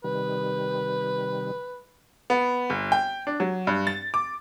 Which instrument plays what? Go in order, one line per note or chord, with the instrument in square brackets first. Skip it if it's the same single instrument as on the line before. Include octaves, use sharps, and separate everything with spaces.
[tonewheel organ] C3 D#3 G3 [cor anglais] B4
[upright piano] B3
G1
G5
D4
F#3
G2
A6
D6